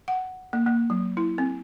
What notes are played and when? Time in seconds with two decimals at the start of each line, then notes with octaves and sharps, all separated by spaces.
0.08 F#5
0.53 A#3
0.66 A#3
0.90 F#3
1.17 E4
1.38 C4